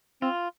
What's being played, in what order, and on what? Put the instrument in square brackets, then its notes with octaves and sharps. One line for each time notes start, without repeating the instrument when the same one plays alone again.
[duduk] C4 [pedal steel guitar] F4